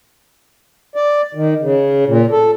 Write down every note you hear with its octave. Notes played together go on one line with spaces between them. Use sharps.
D5
D#3
C#3
A#2
A4